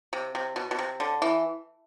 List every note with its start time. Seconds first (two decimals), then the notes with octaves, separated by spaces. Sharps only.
0.13 C3
0.35 C3
0.56 B2
0.71 B2
0.79 C3
1.00 D3
1.22 E3